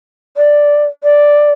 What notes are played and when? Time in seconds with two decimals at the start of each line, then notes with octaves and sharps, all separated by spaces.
0.37 D5
1.04 D5